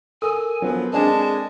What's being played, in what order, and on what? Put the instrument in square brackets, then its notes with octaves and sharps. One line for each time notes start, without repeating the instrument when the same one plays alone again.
[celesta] A4 A#4 E6 [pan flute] G#5 [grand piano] D#6
[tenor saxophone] F3 [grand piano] F#3 B3
[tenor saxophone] G#3 [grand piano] C4 D4 G#5 [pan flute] A5